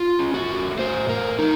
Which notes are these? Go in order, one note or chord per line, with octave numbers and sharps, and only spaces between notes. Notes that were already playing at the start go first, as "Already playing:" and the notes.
Already playing: F4
C#4
F#4
A3
A2 C5
A3 A#4
F3 D#4